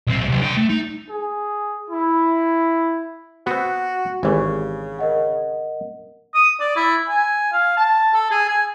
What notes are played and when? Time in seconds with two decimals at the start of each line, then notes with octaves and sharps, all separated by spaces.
0.07 B1 C4
0.29 C3 F#3
0.40 D3 G5
0.57 A3
0.69 D#4
1.09 G#4
1.90 E4
3.47 B3 C4 F#4
4.23 G#1 C#3 E3 G4 C#6
4.99 A#4 D#5 F#5
6.34 D#6
6.60 D5
6.76 E4
7.09 G#5
7.53 F5
7.77 A5
8.14 A4
8.31 G#4
8.49 G#5